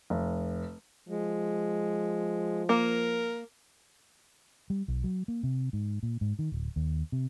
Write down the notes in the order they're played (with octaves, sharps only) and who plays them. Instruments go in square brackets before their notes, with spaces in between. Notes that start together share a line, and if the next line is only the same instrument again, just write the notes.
[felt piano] F1
[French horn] F3 [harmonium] G#3
[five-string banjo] A#3 [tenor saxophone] A#4
[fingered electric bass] G3
B1
F#3
A#3
C3
G#2
A#2
G#2
D#3
D1
D#2
C3